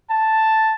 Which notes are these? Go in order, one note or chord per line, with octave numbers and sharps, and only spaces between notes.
A5